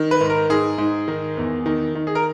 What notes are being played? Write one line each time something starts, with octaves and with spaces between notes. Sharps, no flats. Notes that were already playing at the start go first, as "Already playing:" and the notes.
Already playing: D#3
B4
G#2
A#4
G#2 G#4
G#2
D#3
E2
D#3
D#3
G#4
A#4